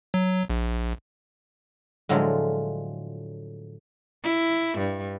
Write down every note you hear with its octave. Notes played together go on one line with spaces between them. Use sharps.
F#3
A#1
A2 D3 F3 F#3 G#3 F4
E4
G2